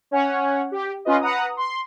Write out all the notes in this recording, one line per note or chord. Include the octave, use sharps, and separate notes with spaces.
C#4 C#5 F#5
G4
C#4 F4 B4 D#5
B4 F#5 A#5 D#6
C6